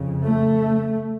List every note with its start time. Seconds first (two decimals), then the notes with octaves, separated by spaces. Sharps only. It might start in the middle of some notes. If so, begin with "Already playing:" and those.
Already playing: F2 C#3
0.24 A3